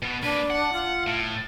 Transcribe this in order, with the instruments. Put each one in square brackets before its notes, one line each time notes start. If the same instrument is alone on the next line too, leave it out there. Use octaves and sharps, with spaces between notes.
[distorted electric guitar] B2 B3
[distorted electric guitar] A#3 B4 [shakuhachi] D4
[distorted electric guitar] F#5
[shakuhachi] F4
[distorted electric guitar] A2